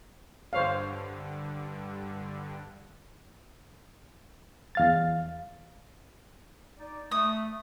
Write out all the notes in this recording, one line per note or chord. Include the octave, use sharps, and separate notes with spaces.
G2 D3 C5 C#5 F5
E2 F5 A6
D#4 D5
A3 D#6